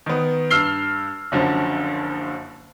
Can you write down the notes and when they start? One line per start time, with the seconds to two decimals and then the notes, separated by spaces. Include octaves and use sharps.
0.06 D#3 B3
0.51 G2 E6 F6 C7 G7
1.32 F#1 F#2 D3 F3